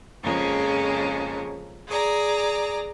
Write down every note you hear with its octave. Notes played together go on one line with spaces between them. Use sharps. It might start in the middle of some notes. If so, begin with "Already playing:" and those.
F2 C#3 F3 G#3 A#3 C#4
G#4 D5 A#5